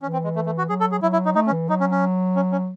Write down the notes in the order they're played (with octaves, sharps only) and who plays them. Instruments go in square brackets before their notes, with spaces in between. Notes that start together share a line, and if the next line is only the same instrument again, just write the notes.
[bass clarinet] E3 [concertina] C#4
[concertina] C4
G#3
A3
A3
F#4
[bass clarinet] F#3 [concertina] G#4
[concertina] A4
G#4
[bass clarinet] F#3 [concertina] E4
[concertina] E4
D#4
[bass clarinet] A3 [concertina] D#4
[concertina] C#4
[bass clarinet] E3
[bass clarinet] F#3 [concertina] D#4
[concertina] C#4
C#4
C#4
C#4